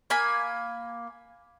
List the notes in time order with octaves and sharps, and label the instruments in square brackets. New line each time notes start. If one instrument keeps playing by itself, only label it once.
[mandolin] A#3 G#5 B5